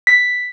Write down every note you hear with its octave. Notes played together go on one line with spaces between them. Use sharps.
B6